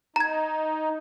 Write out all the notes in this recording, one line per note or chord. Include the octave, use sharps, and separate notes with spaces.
D#4 A#5 G#6